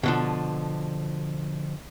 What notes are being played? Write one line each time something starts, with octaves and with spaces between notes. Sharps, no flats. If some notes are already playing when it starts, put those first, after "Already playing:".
B2 D3 F3